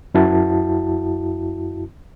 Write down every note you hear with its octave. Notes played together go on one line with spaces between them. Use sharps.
F#2 E4 F#4 A5